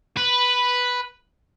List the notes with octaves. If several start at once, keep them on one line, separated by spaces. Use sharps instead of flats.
B4